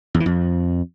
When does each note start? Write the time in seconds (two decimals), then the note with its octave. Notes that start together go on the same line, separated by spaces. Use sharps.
0.14 E2
0.20 E3
0.26 F2